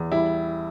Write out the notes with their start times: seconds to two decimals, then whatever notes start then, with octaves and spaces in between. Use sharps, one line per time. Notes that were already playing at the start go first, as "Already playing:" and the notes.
Already playing: E2
0.11 G3 E4